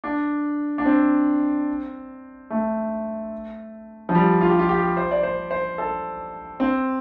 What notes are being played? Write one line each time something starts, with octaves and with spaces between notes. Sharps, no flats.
D4
D4
C4
A3
F3
G3
F4
G4
F4
G4
C5
D5
C5
C5
A4
C4